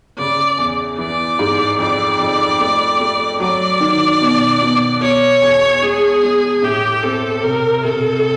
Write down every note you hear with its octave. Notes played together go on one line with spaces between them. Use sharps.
C#3 D5
E2
E3 D5
G#2
F2 D5
F2
A3
A3
F#3 D5
D#3
B2
B2
B2 C#5
E2
G#3 G#4
G#3
A2 G4
C4 A4
C3 A#4
C3 A4